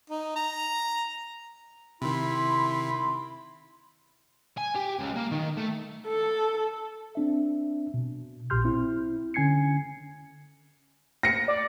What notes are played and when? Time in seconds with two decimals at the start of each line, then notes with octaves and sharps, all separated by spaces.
0.10 D#4
0.36 A#5
2.02 C3 D#3 E4 B5 C6
4.58 G#5
4.76 G4
4.99 C#2
5.17 A#3
5.32 D#3
5.58 A3
6.08 A4
7.15 C4 D4 E5
7.94 B2
8.50 A#1 A#2 G4 C6 F6 G6
8.65 C4 E4
9.34 D3 C#4 G#5 G#6 C7 C#7
11.23 A#6 C#7
11.48 D5